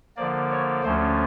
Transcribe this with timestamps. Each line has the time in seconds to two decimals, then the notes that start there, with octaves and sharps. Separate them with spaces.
0.16 D3 F3 A#3 D5
0.51 C#5
0.84 D2 D3 F3 A3 C#4 C5